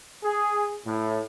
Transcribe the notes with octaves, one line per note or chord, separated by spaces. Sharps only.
G#4
A2